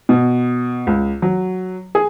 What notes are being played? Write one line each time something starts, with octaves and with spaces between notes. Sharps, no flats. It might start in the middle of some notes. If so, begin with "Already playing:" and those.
B2
C#2
F#3
G#4